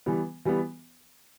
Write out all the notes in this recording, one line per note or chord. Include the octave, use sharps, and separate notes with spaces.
E3 G3 B3
E3 G3 B3